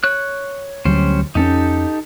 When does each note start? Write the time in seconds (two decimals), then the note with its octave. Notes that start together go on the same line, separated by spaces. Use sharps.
0.04 C#5 F#6
0.85 D2 F#3 G3 C#4 C5
1.35 F2 C4 C#4 D#4 G4 A4